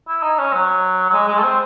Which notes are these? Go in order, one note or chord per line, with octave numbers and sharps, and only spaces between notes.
E4
D#4
C#4
F#3
F#3
G#3
G#3
A3
C4